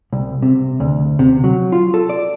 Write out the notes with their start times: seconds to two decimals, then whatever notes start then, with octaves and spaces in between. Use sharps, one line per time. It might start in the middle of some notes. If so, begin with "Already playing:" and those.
0.13 C2
0.42 C3
0.80 D2
1.19 C3
1.44 F#3
1.72 F4
1.94 A4
2.10 D5